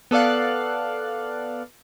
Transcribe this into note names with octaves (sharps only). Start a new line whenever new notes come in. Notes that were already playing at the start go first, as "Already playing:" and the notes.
B3 A4 D5 F5 F#6